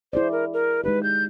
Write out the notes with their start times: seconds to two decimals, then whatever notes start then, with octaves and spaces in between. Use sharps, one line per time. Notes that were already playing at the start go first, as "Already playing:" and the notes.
0.13 E4 G#4 C5 D5
0.32 A#4
0.53 A#4
0.84 G#3 D#4 G4 B4
1.03 G6